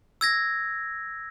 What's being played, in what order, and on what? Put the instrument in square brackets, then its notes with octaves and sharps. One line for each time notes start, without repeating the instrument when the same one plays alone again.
[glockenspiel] E6 G#6 A#6